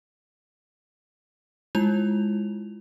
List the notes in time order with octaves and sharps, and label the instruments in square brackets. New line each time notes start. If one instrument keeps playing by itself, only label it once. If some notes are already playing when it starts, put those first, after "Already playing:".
[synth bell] G#3 E4 F4 F7